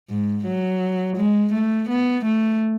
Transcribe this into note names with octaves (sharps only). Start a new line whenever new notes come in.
G#2
F#3
G#3
A3
B3
A3